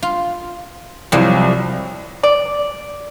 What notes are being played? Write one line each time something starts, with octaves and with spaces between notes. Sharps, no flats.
F4
C2 F3 F#3
D5